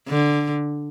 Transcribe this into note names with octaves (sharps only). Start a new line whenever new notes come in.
D3